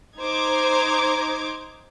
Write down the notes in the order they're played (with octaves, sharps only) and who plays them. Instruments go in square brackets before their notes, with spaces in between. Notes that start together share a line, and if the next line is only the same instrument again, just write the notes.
[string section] D#4 C5 A#5 D6 G#6